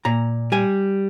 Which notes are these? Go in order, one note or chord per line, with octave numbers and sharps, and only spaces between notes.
A#2 A#5
G3 G#5